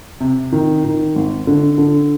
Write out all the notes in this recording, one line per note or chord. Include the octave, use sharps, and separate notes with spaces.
C3
D#3
D#3
G#1
D3
D3